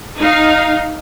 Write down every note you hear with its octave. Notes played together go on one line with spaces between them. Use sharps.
D#4 F5